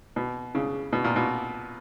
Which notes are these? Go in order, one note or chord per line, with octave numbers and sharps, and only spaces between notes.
B2
C#3
B2
A#2
B2